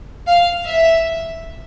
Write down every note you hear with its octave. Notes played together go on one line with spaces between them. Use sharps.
F5
E5